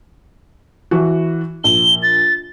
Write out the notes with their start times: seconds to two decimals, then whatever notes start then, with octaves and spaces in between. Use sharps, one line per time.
0.91 E3 F#4
1.64 A#1 G7
2.03 A6